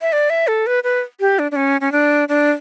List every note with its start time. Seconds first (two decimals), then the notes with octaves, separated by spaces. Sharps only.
0.01 E5
0.13 D5
0.30 E5
0.47 A4
0.67 B4
0.84 B4
1.20 G4
1.39 D4
1.51 D4
1.56 C#4
1.81 C#4
1.92 D4
2.29 D4